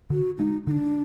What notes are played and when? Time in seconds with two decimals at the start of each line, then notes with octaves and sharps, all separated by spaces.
0.10 D3 F#4
0.38 G#3 D4 D#4
0.67 D3 D4 D#4